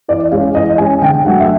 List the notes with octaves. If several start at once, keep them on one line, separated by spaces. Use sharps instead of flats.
E3 D5
G#3 C#4 F5
E3 D#5
G#3 C#4 G#5
D3 G5
F#3 A3 D4 F#5
E5